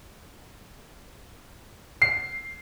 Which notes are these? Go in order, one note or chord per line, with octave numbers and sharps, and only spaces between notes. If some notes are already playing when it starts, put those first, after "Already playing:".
C7